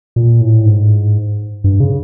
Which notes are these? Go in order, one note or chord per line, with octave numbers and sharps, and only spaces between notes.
A#2
A2
G#2
G2
C#3